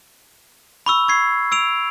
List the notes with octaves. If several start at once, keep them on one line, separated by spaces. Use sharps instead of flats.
B5 C#6 E6
C#6 G#6 C7
E6 D7 F7